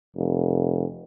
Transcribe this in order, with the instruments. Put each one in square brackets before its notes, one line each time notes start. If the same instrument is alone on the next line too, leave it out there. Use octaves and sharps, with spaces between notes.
[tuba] F1